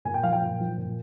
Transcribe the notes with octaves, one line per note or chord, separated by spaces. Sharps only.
A#2 G#5
G5
F3 F5
G5
A#2
F3
A#2